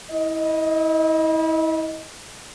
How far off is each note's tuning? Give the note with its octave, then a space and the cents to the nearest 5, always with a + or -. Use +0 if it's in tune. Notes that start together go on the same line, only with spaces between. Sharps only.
E4 -30 D#5 +10